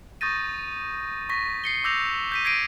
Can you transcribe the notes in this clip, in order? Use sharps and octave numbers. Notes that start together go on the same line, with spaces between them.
C#6 D#6 G6 A6 A#6 D#7
C#6 A#6 B6
C7 C#7 G7
D6 E6 G6 A#6 F7
G6 B6 D#7
G#6 A#6 C7 D7 D#7